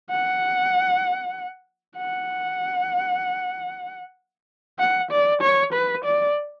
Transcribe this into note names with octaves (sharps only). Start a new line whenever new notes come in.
F#5
F#5
F#5
D5
C#5
B4
D5